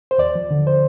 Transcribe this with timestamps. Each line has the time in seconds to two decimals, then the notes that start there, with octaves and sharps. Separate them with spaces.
0.11 C5
0.18 D#2 D5
0.35 F3
0.51 D3
0.67 C5